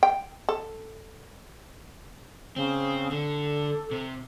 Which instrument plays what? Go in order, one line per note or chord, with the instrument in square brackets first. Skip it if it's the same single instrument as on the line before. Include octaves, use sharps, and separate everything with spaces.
[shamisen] G5
A4
[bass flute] C#3 [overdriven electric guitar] C4
[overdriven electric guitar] D3 [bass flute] A4
[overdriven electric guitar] C3